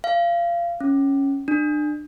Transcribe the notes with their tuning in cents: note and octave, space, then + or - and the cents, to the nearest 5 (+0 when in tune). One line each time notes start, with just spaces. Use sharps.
F5 -25
C#4 -5
D4 +30